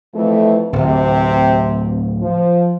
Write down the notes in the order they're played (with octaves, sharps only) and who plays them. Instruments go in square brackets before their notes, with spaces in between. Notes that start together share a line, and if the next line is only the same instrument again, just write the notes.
[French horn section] F2 E3 A3
[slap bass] D1 [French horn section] C3 C4
[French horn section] F3